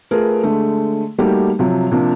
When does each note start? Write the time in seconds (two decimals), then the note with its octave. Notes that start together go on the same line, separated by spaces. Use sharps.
0.11 A3 F4 G#4 A#4 B4
0.43 D3 G#3 A3
1.18 G3 A3 A#3 D#4 F#4 G4
1.59 C3 F3 F#3
1.91 C3 F3 A#3 D4